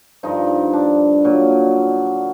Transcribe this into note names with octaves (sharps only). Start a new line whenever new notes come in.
G2 D3 F3 D#4
D4
A#2 F#3